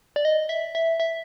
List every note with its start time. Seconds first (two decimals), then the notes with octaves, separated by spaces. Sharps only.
0.16 D5
0.25 D#5
0.49 E5
0.75 E5
1.00 E5